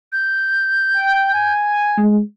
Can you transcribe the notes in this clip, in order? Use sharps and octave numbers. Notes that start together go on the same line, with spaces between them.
G6
G5
G#5
G#3